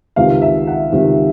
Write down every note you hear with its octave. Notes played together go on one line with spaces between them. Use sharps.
C#2 C3 D#3 F5
E5
F#5
C#2 C3 D#3